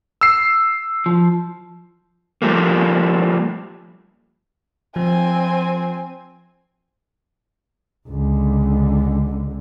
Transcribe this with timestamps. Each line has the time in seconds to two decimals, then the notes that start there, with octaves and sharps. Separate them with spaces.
0.21 E6 C7
1.06 F3
2.42 F3 G3 A3 A#3
4.96 F3 C4 G#5
8.09 C#2 D3